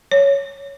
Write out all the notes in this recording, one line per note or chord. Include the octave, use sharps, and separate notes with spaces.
C#5